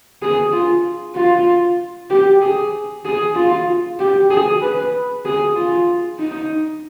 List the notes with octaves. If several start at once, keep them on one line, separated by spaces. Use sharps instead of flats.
G#4
F4
F4
G4
G#4
G#4
F4
G4
G#4
B4
G#4
F4
D#4